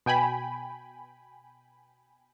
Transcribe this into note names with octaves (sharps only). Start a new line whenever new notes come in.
B2 G5 G#5 B5